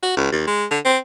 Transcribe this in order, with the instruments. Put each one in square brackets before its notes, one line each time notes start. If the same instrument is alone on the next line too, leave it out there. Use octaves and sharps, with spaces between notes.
[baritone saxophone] F#4
C#2
D#2
G#3
D3
C4